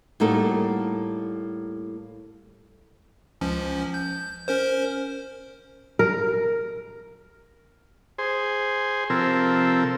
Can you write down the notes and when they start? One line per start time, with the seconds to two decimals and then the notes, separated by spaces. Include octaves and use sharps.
0.20 A2 G3 A#3 D#4 F#4 A4
3.41 C#2 F3 C#4
3.94 G6
4.48 C#4 A#4 C5
5.99 A#4
8.18 G#4 C5
9.10 C3 F3 C4 A4 A#4 E6